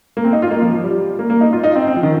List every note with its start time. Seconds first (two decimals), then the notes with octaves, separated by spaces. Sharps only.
0.17 A#3
0.24 C4
0.33 D#4
0.42 F4
0.51 A#3
0.62 F3
0.73 F3
0.84 G3
1.19 A#3
1.30 A#3
1.41 D#4
1.53 F4
1.63 D#4
1.75 C4
1.87 C4
1.96 F3
2.03 D#3